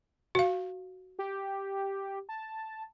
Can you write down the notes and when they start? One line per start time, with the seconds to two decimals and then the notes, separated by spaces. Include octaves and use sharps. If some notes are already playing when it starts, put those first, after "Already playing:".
0.35 F#4 F5
1.19 G4
2.29 A5